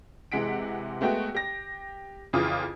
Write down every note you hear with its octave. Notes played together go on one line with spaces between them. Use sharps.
C3 E3 G#3 F#5 B6 D7
G#3 A3 B3 F#4 G5
G4 A#6
F2 C#3 E3 F4 D6 D#6